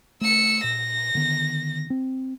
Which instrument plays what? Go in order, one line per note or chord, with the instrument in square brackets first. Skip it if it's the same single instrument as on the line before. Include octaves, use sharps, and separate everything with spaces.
[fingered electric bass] A3 [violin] E6 C#7
[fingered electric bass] A#2 [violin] A#6
[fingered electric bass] D3 D#3 B3
C4